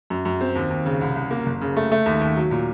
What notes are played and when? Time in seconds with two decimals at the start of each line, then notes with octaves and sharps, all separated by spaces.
0.10 F#2
0.25 F#2
0.41 C4
0.56 D#2
0.70 D#2
0.86 C#3
1.01 C2
1.16 C2
1.31 A#3
1.46 F#1
1.61 C#3
1.77 A3
1.92 A3
2.06 D#2
2.21 D#2
2.37 F#3
2.51 A#2